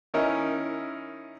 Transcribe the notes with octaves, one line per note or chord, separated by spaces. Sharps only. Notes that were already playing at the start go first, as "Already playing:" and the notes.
D#3 C#4 D#4 E4 A#4